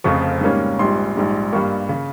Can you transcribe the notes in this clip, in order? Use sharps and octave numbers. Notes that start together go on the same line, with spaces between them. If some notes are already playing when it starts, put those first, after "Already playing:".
F1 F2 C#3 F3 C#6
G#2 G3 A#3 C#4
A#1 G#2 G3 C6
A#1 G#2 G3
G2 G3 A#3 C#6
C#3